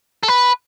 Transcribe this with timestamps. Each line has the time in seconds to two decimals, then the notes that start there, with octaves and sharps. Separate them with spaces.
0.23 A4
0.28 B4